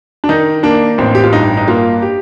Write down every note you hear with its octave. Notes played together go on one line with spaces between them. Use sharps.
D4
D#3 D#4
A#3 D4
A1 C4
G4
F4
G2 D#4
D#4
A#3 F4
G4